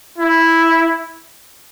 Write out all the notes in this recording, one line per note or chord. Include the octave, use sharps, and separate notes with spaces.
E4